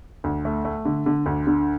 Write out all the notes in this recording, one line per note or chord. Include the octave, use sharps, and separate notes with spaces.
D2
A3
A3
D3
D3
D2
D3